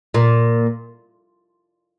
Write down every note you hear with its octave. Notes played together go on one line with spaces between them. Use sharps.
A#2